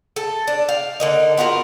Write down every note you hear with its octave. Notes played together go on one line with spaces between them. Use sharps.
A4
D4
F5
D3 A#3 D#4
B3 F4 F#4 A#4